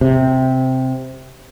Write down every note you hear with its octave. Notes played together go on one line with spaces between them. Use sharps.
C3